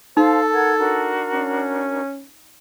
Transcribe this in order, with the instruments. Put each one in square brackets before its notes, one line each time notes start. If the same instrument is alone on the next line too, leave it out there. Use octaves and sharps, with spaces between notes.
[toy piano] D#4 [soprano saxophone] A4 [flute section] C5 F5
[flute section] A#4 F#5 G#6
D4 F#4 A#4
[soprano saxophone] C#4